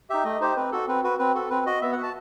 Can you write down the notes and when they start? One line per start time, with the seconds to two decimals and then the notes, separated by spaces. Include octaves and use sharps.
0.10 D#4 G4 E5
0.24 A3 D#5
0.40 D#4 G4 C5
0.56 C4 B4
0.72 F#4 A4
0.88 C4 B4
1.04 F#4 B4
1.19 C4 B4
1.34 F#4 A4
1.50 C4 B4
1.66 F#4 D#5
1.82 B3 E5
1.93 F#5
1.97 F#4
2.03 A5